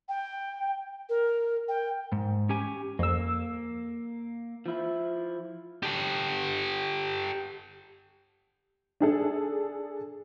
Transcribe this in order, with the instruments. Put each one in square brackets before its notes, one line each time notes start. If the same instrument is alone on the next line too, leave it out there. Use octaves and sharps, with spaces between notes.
[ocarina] G5
A#4
G5
[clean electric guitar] G#2
C#4 G4 G#5
[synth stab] F2 E6 [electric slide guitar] A#3
[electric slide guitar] F3 E4
[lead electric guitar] G4 A4
[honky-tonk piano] D4 G#4 A4